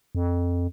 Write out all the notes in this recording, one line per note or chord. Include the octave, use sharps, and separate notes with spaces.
F2